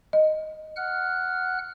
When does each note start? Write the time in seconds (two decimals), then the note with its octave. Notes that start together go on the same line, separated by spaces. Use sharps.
0.13 D#5
0.76 F#5 F6 F#6